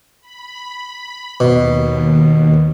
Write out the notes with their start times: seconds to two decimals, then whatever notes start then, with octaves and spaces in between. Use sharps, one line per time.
0.21 B5
1.40 D#2 B2